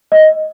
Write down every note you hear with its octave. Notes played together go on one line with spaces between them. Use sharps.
D#5